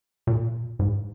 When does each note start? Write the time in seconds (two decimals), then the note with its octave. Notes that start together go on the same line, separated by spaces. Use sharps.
0.27 A#2
0.79 G#2